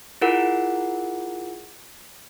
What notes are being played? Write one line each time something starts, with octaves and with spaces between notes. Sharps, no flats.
E4 F4 G#4 A#4 F#5